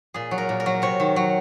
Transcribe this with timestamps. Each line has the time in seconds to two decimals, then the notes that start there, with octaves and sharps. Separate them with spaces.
0.14 A#2 G#4
0.31 F#3
0.38 A#4
0.49 A#2
0.60 A#4
0.66 F#3
0.82 C3 C#5
1.00 D#3
1.16 F#3